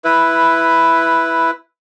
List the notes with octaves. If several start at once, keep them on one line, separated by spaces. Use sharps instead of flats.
E4 B4